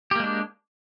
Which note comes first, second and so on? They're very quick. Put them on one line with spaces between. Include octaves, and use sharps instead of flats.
G4 A#3 G#3 D4